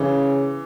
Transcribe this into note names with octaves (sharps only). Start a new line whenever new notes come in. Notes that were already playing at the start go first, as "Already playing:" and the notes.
Already playing: C#3 E3